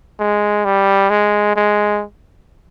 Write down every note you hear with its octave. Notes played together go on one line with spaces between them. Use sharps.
G#3
G3
G#3
G#3